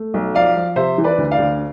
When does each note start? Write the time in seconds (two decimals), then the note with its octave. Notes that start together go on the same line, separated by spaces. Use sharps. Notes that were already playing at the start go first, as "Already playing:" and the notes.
Already playing: A3
0.14 B1
0.35 F3 D5 F5
0.56 F3
0.76 C3 C5 E5
0.98 E3
1.04 B4 D5
1.18 D2
1.31 D5 F5
1.38 D2